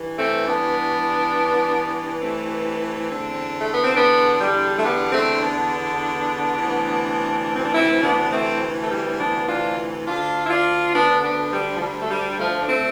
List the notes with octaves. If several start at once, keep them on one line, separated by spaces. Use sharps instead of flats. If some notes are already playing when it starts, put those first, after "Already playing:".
Already playing: G2 E3
A3 C4
B3 D4
A3 C4
E2 D3
A3
B3
C4
B3 D4
G3
A3
G3 B3
A3 C4
B3 D4
D2 C3 E3
C4
D4
C4 E4
B3 D4
A3 C4
A3
G3
B3 D4
D4 F4
D2 D3 D4 F4
E4
D4 F4
B3 D4
B3 D4
G3
F3
G3
A3
G3
F3 A3
D4
A3 C4